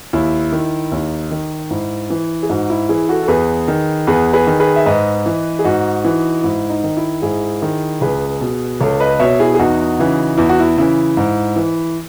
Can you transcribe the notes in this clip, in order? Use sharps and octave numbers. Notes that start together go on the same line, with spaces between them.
D#2 E4
D#3
D#2 D#4
D#3
G#2 E4
E3
G#4
G#2 D#4 F#4
E4
E3 E4 G#4
F#4 A4
A4
E2 G#4 B4
D#3
E2 G#4 B4
G#4 B4
D#3
G#4 B4
E5
G#2 B4 D#5
E3
G#4
G#2 D#4 F#4
E3
G#2 E4
D#4
D#3
E4
G#2 E4 G#4
D#3
C#2 G#4 B4
B2
C#2 A4 C#5
B4 D#5
B2 C#5 E5
E4 G#4
G#4
E2 D#4 F#4
C#3 E3
E2 E4
F#4
E4
C#3 E3 E4
G#2
E3